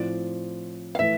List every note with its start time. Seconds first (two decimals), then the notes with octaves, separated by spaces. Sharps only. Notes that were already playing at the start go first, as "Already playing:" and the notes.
Already playing: A2 F3 C4 D5
0.95 F5
0.99 A2 E3 A3 E4 B4 E5